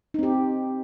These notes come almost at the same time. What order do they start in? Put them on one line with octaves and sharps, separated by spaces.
D#4 C4 G4